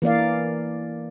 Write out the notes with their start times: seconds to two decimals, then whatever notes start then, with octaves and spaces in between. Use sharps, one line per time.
0.02 E3 A#3 D5 F5